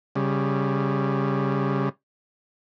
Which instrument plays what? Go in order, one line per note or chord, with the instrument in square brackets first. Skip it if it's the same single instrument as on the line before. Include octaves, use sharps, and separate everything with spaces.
[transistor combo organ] C#3 G3